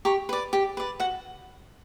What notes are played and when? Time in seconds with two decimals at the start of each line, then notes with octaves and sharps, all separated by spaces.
0.05 G4 A#5 C#6
0.29 B4 D5
0.53 G4
0.77 B4 D5
1.00 F#4 F#5